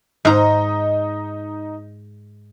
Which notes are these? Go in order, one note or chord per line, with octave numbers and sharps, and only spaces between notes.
G#2 D#4 D#5 A#5